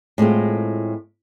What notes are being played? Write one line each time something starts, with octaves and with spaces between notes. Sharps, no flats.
A2 G#3 C4 F4